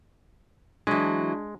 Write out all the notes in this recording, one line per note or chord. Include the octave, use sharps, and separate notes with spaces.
E3 F#3 G#3 D4